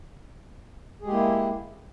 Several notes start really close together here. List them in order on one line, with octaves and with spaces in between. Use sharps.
G#4 G#3 G4 A#3 E4